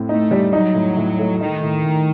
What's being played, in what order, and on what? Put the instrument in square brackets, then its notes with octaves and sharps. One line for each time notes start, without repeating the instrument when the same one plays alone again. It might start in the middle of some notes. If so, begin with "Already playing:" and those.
Already playing: [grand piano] A2 C4
[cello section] A3 [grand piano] D#4
[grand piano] G3
[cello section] F#3 [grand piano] D#4
[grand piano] A2
A2
A3
[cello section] D#3 [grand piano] D#4
[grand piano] A2
A2